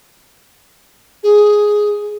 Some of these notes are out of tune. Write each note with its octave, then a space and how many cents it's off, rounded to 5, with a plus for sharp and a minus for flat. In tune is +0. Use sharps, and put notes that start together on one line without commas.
G#4 +5